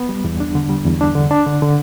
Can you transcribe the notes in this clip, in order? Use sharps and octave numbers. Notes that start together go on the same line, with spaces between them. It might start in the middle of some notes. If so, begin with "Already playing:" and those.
Already playing: B3
G3
E2
D4
D3
G3
E2
D4
D3
D4
D3
D3